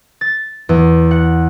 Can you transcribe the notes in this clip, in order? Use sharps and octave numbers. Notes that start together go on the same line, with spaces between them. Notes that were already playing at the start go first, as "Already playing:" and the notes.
A6
E2
F#5